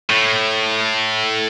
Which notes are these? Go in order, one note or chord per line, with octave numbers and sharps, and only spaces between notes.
A2